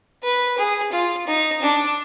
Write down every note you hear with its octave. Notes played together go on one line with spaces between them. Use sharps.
B4
G#4
F4
D#4
D4